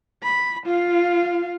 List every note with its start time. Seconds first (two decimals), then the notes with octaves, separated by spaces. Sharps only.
0.23 B5
0.66 F4 F5